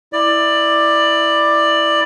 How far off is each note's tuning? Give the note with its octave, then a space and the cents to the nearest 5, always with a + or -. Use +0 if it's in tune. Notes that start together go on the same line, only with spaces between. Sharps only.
E4 +0 D5 +15